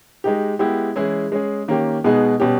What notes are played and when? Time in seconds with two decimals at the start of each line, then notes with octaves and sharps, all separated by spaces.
0.24 G#3 D#4 G4
0.59 G#3 B3 E4 G4
0.95 E3 G#3 C#4 E4 G#4
1.32 G#3 C#4 G#4
1.68 D#3 A#3 C#4 G4
2.04 B2 G#3 B3 D#4 G#4
2.40 B2 G3 C#4 G4